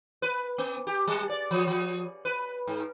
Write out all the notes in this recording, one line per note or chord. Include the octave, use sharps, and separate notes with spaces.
B4
B3
G4
G3
D5
F3
F3
B4
G#2